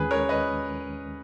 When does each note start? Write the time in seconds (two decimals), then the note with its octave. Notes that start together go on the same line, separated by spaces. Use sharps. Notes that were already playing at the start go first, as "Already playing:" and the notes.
Already playing: D#2 D#3 G#3 C#4 G#4 B4
0.11 A#4 C#5
0.29 B4 D#5